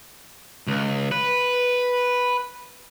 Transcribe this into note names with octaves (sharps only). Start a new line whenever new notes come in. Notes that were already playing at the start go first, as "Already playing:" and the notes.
C#2
B4